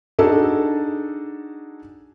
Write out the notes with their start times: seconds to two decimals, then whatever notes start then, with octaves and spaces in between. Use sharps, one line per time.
0.19 D4 D#4 F#4 G#4 A4